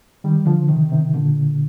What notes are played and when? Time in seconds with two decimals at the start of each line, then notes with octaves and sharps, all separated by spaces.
0.24 D#3 G3
0.47 D3 F3
0.69 C3 D#3
0.92 C3 D#3
1.15 A#2 D3